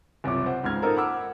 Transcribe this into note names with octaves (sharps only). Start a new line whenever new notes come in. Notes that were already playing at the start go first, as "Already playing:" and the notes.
F#1 C2 F3 C#5 D6
C5 F#5
C#2 G#2 C#3 F6 G#6
A#3 D#4 F4 A4 A#4 C5
F#5 B5 D6 E6 F6